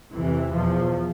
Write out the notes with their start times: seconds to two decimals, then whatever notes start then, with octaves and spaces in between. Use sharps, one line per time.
0.15 F2 C3 E3
0.52 E2 B2 F3